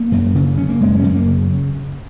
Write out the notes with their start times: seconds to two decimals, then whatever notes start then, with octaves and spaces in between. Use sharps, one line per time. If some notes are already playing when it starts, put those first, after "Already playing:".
Already playing: A#3
0.12 F#2
0.35 C#3
0.58 C#3 C#4
0.69 A#3
0.81 F#2 G#3
0.99 C#4
1.04 F#2
1.15 A#3
1.27 C#3